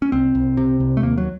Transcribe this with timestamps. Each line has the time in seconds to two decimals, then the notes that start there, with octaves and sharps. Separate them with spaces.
0.02 C#4
0.12 C2 C4
0.35 C2
0.57 C3
0.80 C2
0.97 A3
1.02 D#2 A#3
1.18 F#3